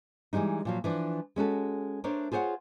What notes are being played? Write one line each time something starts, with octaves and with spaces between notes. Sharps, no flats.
E3 G3 G#3 D4 D#4
A#2 F3 F#3
E3 F3 D4
G#3 C#4 F#4 A4
A3 D4 A#4 C5 C#5
F4 G#4 C5 C#5 F#5